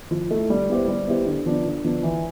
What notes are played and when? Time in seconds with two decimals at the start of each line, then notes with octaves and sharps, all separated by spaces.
0.11 F3
0.31 A3 E4
0.50 G3
0.69 B3 E4 G4 C5
0.88 G3
1.07 B3 E4 G4 C5
1.26 D3
1.46 F3 B3 D4
1.65 D3
1.84 F3 B3 D4
2.03 E3